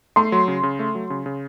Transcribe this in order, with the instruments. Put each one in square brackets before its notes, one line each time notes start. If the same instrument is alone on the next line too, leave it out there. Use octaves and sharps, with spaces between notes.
[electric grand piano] A3 [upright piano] C6
[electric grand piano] F#3
C#3
C#3
A3
F#3
C#3
C#3